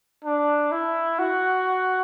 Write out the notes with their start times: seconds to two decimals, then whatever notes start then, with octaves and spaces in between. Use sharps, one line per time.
0.25 D4
0.72 E4
1.19 F#4